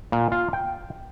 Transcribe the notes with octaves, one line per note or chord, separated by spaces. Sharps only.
A#2
F4
G5